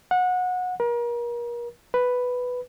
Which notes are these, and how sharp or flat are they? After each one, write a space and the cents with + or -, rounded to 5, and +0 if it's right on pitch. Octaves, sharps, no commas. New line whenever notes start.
F#5 -25
A#4 +35
B4 +5